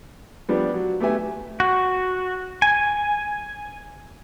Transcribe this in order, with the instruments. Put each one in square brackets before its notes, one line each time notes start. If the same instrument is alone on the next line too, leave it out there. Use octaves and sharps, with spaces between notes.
[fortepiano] F3 G3 B3 D4
F#3
A3 B3 G4 B4 E5 G#5
[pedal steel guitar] F#4
G#5